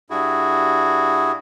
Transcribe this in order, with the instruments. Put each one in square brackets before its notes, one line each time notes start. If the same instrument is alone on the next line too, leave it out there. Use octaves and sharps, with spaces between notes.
[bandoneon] G2 E4 F#4 G#4